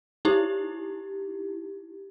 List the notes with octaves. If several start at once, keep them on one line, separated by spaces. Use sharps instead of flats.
D#4 E4 G4